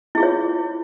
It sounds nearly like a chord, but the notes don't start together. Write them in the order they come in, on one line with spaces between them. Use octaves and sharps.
E4 G#4 F4 C#5